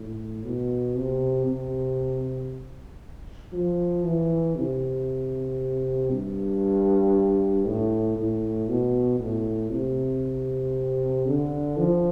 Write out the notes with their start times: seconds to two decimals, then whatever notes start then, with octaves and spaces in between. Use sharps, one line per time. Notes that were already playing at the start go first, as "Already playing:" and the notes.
Already playing: A2
0.44 B2
0.95 C3
1.46 C3
3.53 F3
4.04 E3
4.56 C3
6.10 G2
7.65 A2
8.16 A2
8.68 B2
9.20 A2
9.71 C3
11.26 D3
11.77 F3